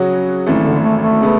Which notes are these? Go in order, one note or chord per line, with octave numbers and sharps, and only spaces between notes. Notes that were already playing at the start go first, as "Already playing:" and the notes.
Already playing: C#3 F#3 C#4 F#4
G#1 F#2 E3 A3
D3
A3
A3
C#3 G#3 B3